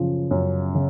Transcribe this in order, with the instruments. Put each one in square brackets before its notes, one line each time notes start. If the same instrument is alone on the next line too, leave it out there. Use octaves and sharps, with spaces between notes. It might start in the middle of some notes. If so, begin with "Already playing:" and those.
Already playing: [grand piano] F#2 C#3 F3
F#2
C#3